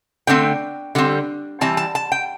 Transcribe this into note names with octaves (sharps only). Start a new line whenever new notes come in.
D3 A3 C4 G5
D3 G3 C4
E3 G3 C4 A5
A5
A5
G5